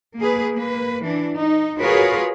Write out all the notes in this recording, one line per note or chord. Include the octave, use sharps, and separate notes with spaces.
A#3 G#4 B4
A#3 B4
E3 D4
D#4
F4 F#4 G#4 A#4 B4 C#5